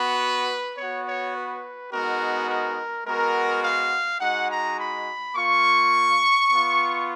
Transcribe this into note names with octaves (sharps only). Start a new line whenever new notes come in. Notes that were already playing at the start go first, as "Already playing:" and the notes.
Already playing: B3 F#4 B4
B3 F#4 C#5
C#5
B4
G#3 B3 D#4 F#4 A#4
A#4
G#3 B3 F#4 A#4
F5
G#3 D#4 F#4 F#5
A#5
B5
A#3 F4 C#6
B3 F4